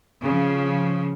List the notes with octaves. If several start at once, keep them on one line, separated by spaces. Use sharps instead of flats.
C#3 F3